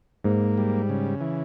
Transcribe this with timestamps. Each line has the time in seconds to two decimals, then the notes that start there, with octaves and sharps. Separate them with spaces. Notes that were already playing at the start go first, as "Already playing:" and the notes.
0.24 G#2 A#3
0.57 G3
0.89 C#3
1.21 E3